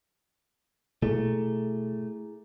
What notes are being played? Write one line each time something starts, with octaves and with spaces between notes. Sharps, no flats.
B2 A3 E4 G#4